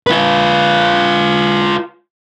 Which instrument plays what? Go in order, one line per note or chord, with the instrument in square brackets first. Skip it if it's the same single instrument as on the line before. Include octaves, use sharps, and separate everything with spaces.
[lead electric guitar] F4 B4